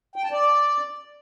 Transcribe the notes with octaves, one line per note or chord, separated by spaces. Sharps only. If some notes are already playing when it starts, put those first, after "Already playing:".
G5
A5
D5